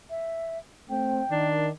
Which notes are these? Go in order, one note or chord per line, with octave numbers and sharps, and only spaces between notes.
E5
A3 C4 G5
D#3 D4